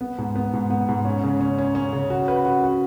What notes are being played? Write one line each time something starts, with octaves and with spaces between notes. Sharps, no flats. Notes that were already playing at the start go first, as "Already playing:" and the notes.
B3
G#2
B3
G#2
B3
G#2
C#4
C#3
C#4
C#4
C#4
C#3
F#4
B4
F#4
F#4